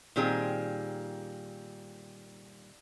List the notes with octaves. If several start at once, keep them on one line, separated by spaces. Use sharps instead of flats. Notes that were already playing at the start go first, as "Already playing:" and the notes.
A#2 D#3 G3 C4 G#4